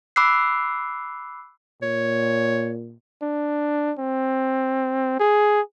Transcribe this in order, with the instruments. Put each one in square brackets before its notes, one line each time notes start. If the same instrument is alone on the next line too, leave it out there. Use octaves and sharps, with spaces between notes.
[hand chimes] B5 D6 E6 F#6 C7
[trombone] A#2 [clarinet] C#5
[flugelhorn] D4
C4
G#4